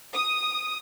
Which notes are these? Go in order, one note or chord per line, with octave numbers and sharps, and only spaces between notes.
D#6